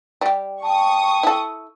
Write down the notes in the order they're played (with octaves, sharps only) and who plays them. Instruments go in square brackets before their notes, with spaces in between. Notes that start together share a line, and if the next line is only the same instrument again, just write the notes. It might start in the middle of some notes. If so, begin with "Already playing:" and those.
[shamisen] G3 G4
[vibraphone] G5 A5 [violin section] C#6 D#6
[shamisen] E4 A4